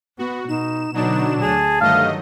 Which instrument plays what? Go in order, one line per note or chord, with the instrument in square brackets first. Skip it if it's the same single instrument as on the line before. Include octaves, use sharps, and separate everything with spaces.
[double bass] B3 [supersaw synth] F#4
[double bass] B2 [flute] D#4 [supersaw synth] E7
[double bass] B2 D3 [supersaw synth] F#3 D4 E7 [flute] D#4
[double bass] D2 [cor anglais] G#4 [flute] A5
[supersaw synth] G2 A3 D#5 [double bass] D#3 F#3 [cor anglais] F5